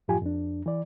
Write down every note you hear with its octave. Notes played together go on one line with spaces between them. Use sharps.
F#2 A2 F3 F4 G4 G#5
F2 D4
E3 D5